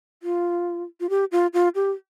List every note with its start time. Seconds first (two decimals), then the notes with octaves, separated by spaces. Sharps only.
0.23 F4
1.00 F4
1.10 G4
1.32 F4
1.53 F4
1.75 G4